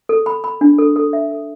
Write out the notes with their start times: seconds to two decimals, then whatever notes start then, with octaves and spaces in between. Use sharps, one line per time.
0.09 A4
0.26 B5
0.44 B5
0.61 D4
0.78 A4
0.96 A4
1.13 E5
1.31 A4